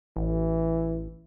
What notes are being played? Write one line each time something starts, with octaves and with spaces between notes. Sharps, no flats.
A1 E3